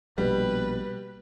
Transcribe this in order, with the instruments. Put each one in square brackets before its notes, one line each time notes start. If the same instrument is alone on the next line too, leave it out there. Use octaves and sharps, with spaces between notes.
[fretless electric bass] A#1 B2 [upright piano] G3 [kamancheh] B4